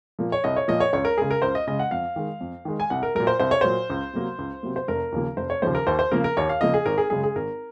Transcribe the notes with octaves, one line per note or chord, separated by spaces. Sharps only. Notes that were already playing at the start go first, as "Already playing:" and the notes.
A#2 F3 A#3
C#5
C2 D#5
C#5
A#2 F3 A#3 D#5
C#5
C#2 C#5
A#4
C#3 G#3 G#4
A#4
C#2 C5
D#5
C#3 G#3 D#5
F#5
F2 F5
D#3 G#3
F2
D#3 G#3
G#5
C2 F#5
A#4
A#2 F#3 A#4
C5
C2 C5
C#5
A#2 F#3 C5
C#2
C3 F#3 A#3
C#2
C3 F#3 A#3
C5
F1 A#4
D#2 C#3 F3 A#3
F1 C5
C#5
D#2 C#3 F3 A#3 C5
A#4
D#2 C5
C5
C#3 F3 A#3 A#4
A#4
D#2 C#5
F5
C#3 F3 A#3 D#5
G#4
G#1 A#4
G#4
F#2 C#3 G#3 G#4
G#4
G#1 A#4